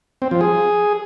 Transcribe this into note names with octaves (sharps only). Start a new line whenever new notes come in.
C4
F3
G#4